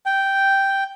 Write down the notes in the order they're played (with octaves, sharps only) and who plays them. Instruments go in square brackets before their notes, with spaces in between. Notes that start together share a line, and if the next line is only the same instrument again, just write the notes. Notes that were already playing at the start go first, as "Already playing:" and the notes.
[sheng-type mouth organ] G5